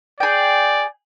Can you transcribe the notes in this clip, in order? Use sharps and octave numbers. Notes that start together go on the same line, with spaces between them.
G#4 D5 G5